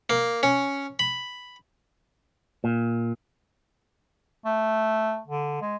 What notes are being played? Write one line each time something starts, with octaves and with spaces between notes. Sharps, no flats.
A#3
C#4
B5
A#2
A3
D3
G#3